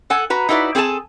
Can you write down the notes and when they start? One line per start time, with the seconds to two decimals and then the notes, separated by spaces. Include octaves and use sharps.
0.10 A4 F#5 G#5
0.30 F#4 B4 A#5
0.49 D#4 E4 F#4 B4 D5
0.75 C4 G#4 A4 G#5 A5